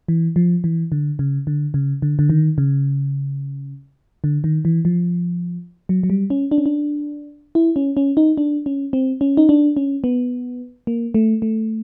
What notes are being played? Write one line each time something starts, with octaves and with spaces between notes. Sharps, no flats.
E3
F3
E3
D3
C#3
D3
C#3
D3
D3
D#3
C#3
D3
D#3
E3
F3
F#3
F#3
G3
C#4
D4
C#4
D4
E4
C#4
C#4
D#4
D4
C#4
C4
C#4
D#4
D4
C#4
B3
A#3
A3
A3